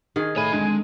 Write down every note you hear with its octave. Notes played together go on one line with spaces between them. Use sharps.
D#3 G#4
A2 C#5 G#5 B5
F2 D3 G#3